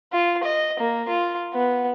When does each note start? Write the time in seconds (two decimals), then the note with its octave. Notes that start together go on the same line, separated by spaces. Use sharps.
0.13 F4
0.43 D#5
0.79 A#3
1.08 F4
1.54 B3